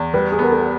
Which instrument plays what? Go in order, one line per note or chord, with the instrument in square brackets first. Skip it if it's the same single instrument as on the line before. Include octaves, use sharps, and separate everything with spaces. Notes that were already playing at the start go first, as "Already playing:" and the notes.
Already playing: [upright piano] E2
[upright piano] G3 [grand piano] B4
[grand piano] G#4
[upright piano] B3 [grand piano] A#4
[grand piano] A4